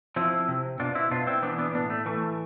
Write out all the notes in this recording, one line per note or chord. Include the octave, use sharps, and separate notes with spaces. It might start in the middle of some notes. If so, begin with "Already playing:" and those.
F3 C4 E4
C3
B2 D4 F4
C4 E4
B2 D4 F4
C4 E4
E3 B3 D4
B3 D4
A2 B3 D4
A3
E3 A3